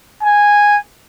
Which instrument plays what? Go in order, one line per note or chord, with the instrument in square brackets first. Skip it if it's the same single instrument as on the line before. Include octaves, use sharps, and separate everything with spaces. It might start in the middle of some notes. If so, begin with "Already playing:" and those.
[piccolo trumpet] G#5